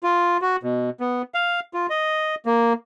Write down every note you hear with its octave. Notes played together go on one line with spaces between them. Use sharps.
F4
F#4
B2
B3
F5
F4
D#5
A#3